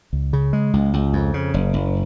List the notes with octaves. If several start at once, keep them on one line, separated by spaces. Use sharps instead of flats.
C#2
C#3
G#3
C#2
C#2
F2
C#3
F#1
F#1